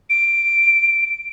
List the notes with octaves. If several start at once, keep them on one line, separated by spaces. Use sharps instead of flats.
D7